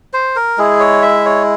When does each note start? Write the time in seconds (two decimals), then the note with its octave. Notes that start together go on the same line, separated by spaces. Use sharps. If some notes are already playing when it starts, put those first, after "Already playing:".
0.13 C5
0.36 A#4
0.58 G#3 E4 G#4
0.80 C#5
1.02 E5
1.25 C#5